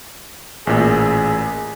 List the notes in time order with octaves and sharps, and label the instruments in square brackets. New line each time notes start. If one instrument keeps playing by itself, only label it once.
[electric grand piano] A1 A#2 [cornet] G#4